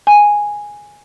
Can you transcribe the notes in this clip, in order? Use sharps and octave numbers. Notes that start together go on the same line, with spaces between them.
G#5